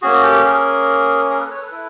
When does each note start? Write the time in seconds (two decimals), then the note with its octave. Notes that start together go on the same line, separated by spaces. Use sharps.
0.02 A#3 C#4 F#4 G#4
0.23 G4 A4
0.45 G#4 A#4
1.30 G#4 A#4
1.40 A4 B4
1.51 B4 C#5
1.61 A4 B4
1.71 E4 A4 B4